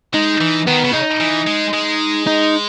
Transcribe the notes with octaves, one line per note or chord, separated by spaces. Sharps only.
G#3 D#4
E3
D#3 B3
C#3
D#4
E3
G#3
G#3
D#4